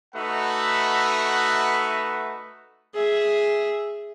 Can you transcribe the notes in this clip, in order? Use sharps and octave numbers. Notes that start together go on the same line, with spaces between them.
A3 D#4 F#4 B4 E5 F#5
G#4 E5